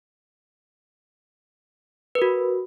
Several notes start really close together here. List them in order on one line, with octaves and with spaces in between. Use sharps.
B4 A#4 F#4